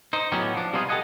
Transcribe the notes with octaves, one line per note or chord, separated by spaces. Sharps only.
D#4 C5
A2 F#3 B3 C#4 D#4 G4
F3 D4
C3 G3 B3 D#4 F4 G#4
G4 A4 B4 D#5 F#5 G#5